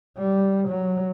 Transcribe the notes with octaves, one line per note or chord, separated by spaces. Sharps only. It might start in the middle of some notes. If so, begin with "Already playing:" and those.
G3
F#3